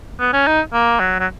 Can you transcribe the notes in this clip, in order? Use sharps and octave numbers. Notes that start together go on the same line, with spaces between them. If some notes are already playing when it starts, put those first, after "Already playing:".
B3
C#4
D#4
A#3
F#3
F#3